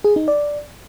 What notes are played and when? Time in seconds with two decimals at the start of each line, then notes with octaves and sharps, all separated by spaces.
0.04 G#4
0.16 D#4
0.28 D5